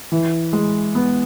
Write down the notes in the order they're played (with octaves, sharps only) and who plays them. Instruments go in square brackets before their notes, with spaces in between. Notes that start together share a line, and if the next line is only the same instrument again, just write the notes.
[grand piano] E3
G#3
B3